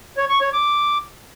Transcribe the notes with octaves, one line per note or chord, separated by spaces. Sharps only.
C#5
C#6
C#5
D6